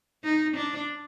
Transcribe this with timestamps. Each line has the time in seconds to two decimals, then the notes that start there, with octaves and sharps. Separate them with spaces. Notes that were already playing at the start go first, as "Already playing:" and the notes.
0.24 D#4
0.56 D4